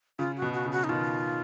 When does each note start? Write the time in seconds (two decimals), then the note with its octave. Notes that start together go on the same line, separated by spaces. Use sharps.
0.19 C#3 F4
0.37 F#4
0.42 B2
0.54 F#4
0.66 C#3
0.72 F#4
0.84 D#4
0.89 B2 D#3 F4